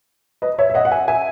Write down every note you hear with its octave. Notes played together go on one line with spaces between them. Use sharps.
B4 D#5
C#5 E5
E5
D#5 F#5
F#5
E5 G#5
E5 G#5